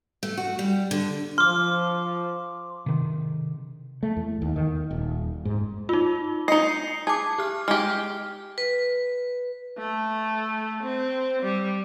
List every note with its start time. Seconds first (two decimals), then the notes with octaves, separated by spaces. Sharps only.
0.23 A3
0.37 F#4
0.59 G3
0.91 D3
1.38 F3 C6 D6 F6
2.86 C3 D#3
4.03 A3
4.17 E2
4.42 D#2
4.56 D#3
4.91 D#1
5.45 G#2
5.89 D#4 F4
6.48 D#4 D#5 C7 C#7
7.07 G#4 A5 D6
7.38 G4 F6
7.68 G#3 G4 F6
8.58 B4
9.78 A3
10.83 C4
11.42 G3